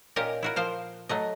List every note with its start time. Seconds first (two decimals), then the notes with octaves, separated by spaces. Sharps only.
0.16 A#2 C#4 G4 A#4 D#5
0.43 E4 F#4 A#4
0.56 F3 C5 F5
1.09 F#3 A3 D#5